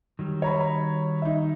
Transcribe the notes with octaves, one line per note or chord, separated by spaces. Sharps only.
D#3 F#3 G3
C#5 A#5 B5
D#4 E5